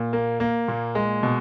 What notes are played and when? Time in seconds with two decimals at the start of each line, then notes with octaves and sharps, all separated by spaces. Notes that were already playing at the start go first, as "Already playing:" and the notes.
Already playing: A#2
0.13 A#3
0.40 A#3
0.68 A#2
0.95 G#3
1.23 B2